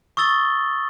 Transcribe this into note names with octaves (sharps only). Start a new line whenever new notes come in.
C#6 D#6 E6 A6 G7